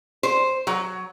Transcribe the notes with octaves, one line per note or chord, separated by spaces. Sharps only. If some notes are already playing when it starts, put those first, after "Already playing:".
C5
F#3